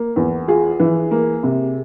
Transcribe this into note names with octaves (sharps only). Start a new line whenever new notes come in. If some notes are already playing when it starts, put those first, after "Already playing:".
Already playing: A#3
E2
F4 G#4
E3
A#3
C3